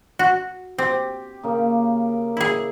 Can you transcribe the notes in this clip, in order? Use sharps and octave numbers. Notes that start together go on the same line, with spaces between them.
F#4
C4 G4
C#3 A#3
E4 G#4